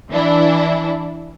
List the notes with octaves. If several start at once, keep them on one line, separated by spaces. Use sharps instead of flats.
E3 D4 E4